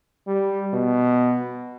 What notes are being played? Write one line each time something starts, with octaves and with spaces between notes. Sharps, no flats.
G3
B2